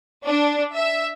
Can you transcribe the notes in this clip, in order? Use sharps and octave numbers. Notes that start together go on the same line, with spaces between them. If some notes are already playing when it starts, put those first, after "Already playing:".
D4
E5